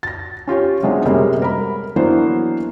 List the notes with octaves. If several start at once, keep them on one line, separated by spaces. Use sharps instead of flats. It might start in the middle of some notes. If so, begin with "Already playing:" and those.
A6 A#6
C#4 F4 G4 C#5
C3 F#3 G#3 B3 C#4 D4
F#2 C3 G3 G#3 A#3
A#4 B5
E3 F#3 A#3 B3 D4 C5